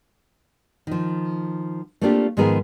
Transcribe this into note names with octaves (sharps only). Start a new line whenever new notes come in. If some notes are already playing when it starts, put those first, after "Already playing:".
D#3 F3
A3 A#3 C4 D4 F4 G4
G#2 D#3 F3 B3 G#4 A#4